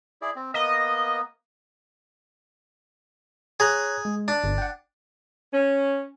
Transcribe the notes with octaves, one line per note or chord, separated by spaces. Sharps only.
E4 G#4 D5
C4
A#3 B3 D#5
G#4 C#5 A#5 F#6
G#3
D4
G1
F#5 G5
C#4